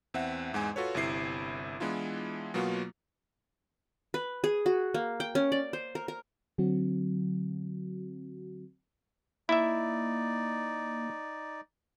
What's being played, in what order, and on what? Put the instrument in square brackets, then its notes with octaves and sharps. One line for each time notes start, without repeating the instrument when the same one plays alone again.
[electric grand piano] E2 C4 E5 F#5
E2 G#2 G#3 G#5
F4 F#4 A4 B4 C#5
G1 C3 E4 C7
E3 G#3 B3 D4 E4 F4
B2 F#3 A#3 B3 F4 F#4
[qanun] B4
G#4
F#4
A#3
G5
C#4
D5
C5
A#4
A#4
[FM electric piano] D3 F#3 C4 F#4
[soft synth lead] A#3 [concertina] D#4 D5 [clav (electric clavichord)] E4 E5